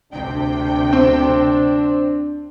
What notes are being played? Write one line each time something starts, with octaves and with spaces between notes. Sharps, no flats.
D2 C3 D4 G5
C4